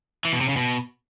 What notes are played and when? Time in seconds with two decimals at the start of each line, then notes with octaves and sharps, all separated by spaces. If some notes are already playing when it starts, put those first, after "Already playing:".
0.25 E3
0.33 B2
0.41 C3
0.49 C#3
0.57 B2